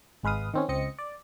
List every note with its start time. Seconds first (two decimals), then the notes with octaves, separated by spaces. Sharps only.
0.23 G#1 G#3 B4 F5 D#6
0.54 D#3 C4 C#4
0.68 C#2 C4 D#5 C#7
0.99 D5